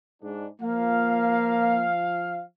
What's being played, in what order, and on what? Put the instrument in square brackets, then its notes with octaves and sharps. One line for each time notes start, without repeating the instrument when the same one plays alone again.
[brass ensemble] G#2 D4
[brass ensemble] F3 F5 [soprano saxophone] A#3